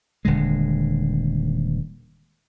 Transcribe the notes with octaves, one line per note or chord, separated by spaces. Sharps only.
D#1 D3 G#3